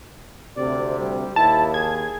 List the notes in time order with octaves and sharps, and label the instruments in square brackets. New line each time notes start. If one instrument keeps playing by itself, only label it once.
[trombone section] D2 C3 [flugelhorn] D5
[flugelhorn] G3
[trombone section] D#2 [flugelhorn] E4 [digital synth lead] A5
[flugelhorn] G#4 [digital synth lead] G#6